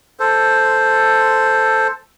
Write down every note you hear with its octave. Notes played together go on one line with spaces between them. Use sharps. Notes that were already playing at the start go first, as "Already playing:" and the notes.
A4 C5